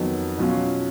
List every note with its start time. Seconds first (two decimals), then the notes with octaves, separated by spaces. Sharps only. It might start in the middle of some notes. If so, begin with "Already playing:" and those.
Already playing: F2 D#3 F#3 B3
0.38 B2 F#3 C#4 F4